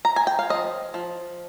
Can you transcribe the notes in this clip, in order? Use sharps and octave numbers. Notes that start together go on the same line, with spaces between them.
A#5
G#5
G5
F5
F3 D#5
F3